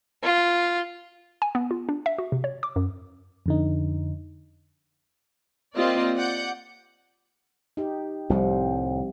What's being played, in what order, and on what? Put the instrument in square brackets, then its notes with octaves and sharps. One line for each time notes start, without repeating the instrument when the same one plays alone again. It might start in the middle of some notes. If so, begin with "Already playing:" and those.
[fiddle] F4
[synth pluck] G#5
B3
F4
D4
E5
F#4
C3
C#5
D6
F#2
[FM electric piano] F2 D3 D#4
[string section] A#3 C4 F4 G4 D5 D#5
D5 F#5 G6
[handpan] D#4 G4
[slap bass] C2 A2 [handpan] F3 G3 C4